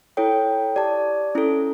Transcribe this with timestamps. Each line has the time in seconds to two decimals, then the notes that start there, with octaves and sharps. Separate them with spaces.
0.17 E4 A4 C#5 G5
0.76 G4 D5 A5
1.35 C#4 E4 A4